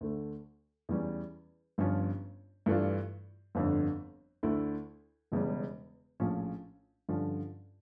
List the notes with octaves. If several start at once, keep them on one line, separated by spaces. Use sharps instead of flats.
D2 D3 A3
E2 E3 G3 C#4
G1 G2 F3 C#4 F4
G2 E3 A3 D4 F4
G1 F2 D3
D2 D3 A3 E4
E1 E2 C#3 G3
A#1 A2 F3 C#4
G2 D3 F3 C#4